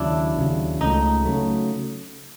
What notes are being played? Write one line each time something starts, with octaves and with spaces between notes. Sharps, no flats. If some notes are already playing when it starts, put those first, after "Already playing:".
Already playing: D#2 C#3 F#3 D4 E4
D#2 C#3 F#3
C#2 C#3 F#3 A3 D#4
C#3 F#3 A3